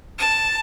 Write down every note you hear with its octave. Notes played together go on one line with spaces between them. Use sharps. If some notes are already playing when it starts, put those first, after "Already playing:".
A5